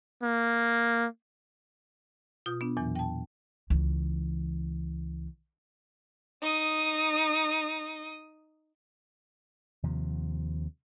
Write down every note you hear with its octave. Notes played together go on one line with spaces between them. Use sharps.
A#3
B2 F4 D#6 G6
B3 D4
E2 A#2 E3 F#3
G5 A5
C#2 E3
D#4 D#6
D#2 C3 F3